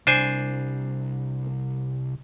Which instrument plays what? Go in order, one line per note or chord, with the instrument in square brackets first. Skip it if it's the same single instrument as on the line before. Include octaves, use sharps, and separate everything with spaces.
[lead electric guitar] C2 [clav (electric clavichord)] D4 C5 G#5